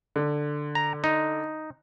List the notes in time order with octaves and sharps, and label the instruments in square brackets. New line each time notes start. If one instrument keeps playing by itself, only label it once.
[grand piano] D3
[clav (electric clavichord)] A#5
D#4